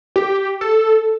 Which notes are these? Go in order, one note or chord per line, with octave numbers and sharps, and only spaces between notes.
G4
A4